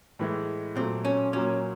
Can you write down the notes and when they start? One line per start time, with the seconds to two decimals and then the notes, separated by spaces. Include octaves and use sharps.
0.19 A2 E3 G#3
0.76 A#2 F#3 A3 C4
1.05 C#4
1.33 A#2 F#3 A#3 C#4